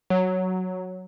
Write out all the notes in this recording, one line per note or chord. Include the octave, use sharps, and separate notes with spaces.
F#3